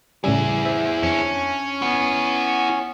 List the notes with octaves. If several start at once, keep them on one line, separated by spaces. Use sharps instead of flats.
A2 C#3 G3 E4 G#4
C5 E5
F2 C#4 D4
B3 E4 F#5